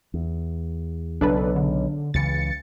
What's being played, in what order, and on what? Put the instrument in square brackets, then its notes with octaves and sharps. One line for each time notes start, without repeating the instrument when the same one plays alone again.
[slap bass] E2
[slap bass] B1 C#3 [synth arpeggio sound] D4 A4 B4
[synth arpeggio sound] D3
[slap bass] C#2 C#3 E3 [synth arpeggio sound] A6 C#7